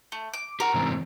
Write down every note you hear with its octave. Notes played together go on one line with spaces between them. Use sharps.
A3
D6
G4 A#4 F#5
G#2 C3 E3